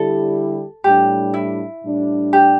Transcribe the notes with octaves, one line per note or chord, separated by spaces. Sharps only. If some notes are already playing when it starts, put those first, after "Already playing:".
Already playing: D3 G3 E4 G4 A4
A2 G3 D4 G4
E4
A2 G3 D4
G4